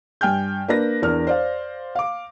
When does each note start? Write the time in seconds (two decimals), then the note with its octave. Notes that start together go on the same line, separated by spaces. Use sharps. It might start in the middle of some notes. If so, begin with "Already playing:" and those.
0.21 G2 G5 G#5 F6 G6
0.68 A#3 D4 B4 A#6
1.02 E2 D4 A#4 F6
1.27 C5 D5 F5
1.95 F5 D6